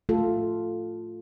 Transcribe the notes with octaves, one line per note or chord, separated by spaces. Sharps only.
A3 F4 A4